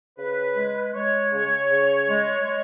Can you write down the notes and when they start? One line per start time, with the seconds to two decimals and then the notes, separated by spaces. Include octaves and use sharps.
0.18 C#3 B4
0.56 G#3
0.94 G#3 C#5
1.32 C#3
1.71 C#3
2.09 G#3
2.46 G#3